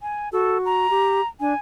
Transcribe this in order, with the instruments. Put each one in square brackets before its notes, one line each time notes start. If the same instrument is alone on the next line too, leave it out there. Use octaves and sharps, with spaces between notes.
[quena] G#5
[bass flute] F#4 [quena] A4
[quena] A#5
[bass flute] G4
[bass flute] D4 [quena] G#5